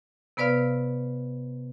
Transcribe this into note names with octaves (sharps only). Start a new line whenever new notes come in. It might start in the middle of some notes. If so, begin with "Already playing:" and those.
C3 B3 B4 D5 F5 F6